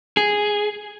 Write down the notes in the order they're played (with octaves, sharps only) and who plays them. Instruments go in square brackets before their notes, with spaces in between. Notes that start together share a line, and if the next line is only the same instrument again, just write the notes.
[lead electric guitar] G#4